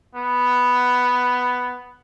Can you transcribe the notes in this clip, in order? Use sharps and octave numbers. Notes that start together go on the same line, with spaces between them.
B3